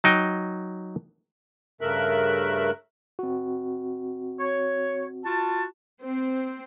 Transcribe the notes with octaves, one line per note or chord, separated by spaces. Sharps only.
F#3 D#4 G5
G2 C#3 A3 A#4 E5 F#6
C4 F#4
C#5
F4 F#4 A5
C4